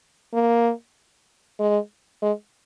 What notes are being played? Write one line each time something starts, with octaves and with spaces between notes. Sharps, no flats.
A#3
G#3
G#3